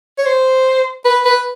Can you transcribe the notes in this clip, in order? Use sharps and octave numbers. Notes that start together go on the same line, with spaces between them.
C#5
C5
B4
B4